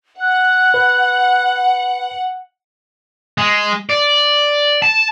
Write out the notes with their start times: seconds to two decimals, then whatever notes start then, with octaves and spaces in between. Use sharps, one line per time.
0.20 F#5 F#6
0.74 B4
3.38 G#3
3.90 D5
4.82 A5